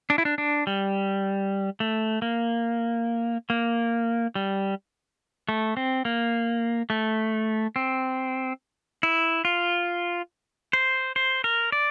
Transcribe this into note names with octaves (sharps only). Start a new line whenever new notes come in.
D4
E4
D4
D4
G3
A3
A#3
A#3
G3
A3
C4
A#3
A3
C4
E4
F4
C5
C5
A#4
D5